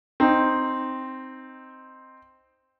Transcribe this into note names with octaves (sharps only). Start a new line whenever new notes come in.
C4 D#4